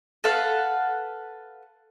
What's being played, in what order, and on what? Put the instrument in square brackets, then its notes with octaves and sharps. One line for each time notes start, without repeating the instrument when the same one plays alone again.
[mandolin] A4 B4 F5 F#5